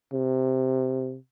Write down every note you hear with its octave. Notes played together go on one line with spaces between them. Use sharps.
C3